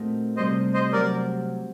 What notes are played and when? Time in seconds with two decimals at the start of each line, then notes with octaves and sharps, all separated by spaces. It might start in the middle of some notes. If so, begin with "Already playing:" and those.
Already playing: A#2 A3 C4 D#4 F#4
0.37 C3 G3 C4 C5 D#5
0.74 C5 D#5
0.93 C3 F#3 C4 G4 A#4 D5